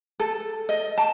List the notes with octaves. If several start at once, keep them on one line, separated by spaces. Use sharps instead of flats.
A4
D#5
A5